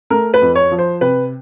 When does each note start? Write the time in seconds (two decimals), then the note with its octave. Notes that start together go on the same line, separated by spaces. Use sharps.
0.10 A3 A#4
0.34 B4
0.42 F2
0.55 C#5
0.71 F3
0.78 C5
1.01 C3 B4